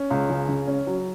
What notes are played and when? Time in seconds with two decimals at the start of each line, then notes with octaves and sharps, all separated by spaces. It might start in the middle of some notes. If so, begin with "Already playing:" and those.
Already playing: C#4
0.10 C#2
0.29 C#3
0.49 C#3
0.67 C#4
0.87 F#3